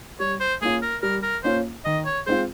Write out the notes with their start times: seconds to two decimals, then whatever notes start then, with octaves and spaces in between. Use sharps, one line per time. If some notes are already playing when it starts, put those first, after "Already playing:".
0.20 G3 C#5
0.41 C5
0.62 A#3 C#4 F4 G#4
0.82 A#4
1.02 G3 A#4
1.23 A#4
1.44 A#3 C#4 F4 C5
1.85 D#3 D#5
2.06 C#5
2.27 G#3 C4 F4 C5